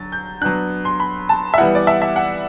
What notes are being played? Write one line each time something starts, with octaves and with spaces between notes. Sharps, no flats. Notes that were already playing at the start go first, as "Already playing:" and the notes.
Already playing: D3 F#3 A6
G6
F#3 B3 D4 F#6
C6
B5
A5
E5
E3 G3 B3 E4 F#5
D5
E5
E5
F#5